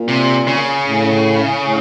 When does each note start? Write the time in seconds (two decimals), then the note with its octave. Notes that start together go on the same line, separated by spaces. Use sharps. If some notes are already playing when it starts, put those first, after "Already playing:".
Already playing: A#2
0.08 C3
0.48 C#3
0.86 A2
1.64 A2